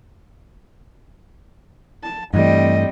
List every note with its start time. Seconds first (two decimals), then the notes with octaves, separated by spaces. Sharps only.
2.03 A5
2.34 G2 E3 G3 A3 C4 D#5